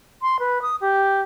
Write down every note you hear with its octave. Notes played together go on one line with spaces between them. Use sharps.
C6
B4
D#6
G4